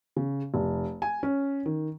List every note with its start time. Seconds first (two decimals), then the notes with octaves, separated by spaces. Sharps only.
0.16 C#3
0.54 F1
1.02 G#5
1.23 C#4
1.66 D#3